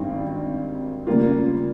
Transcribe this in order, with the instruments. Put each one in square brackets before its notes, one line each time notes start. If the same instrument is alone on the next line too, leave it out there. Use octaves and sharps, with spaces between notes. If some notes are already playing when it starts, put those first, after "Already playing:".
Already playing: [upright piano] G#1 G2 D#3 G3 C4
C#3 G3 A#3 F4